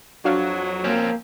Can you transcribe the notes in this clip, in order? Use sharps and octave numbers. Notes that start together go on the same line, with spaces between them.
F2 F#3 D4 F#4 F5
F3 A#3 C4 C#4